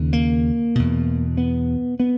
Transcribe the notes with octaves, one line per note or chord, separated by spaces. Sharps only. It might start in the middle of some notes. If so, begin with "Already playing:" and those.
Already playing: D#2 C#3
A#3
E2 B2
B3
B3